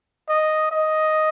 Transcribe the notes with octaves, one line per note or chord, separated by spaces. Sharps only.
D#5
D#5